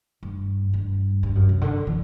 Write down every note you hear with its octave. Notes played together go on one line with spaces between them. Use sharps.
G2
G2
G2
F#2
C3
D3
E3